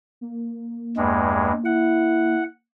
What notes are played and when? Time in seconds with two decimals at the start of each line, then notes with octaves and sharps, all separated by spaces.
0.21 A#3
0.97 E2 G2 G#3
1.65 E4 F#5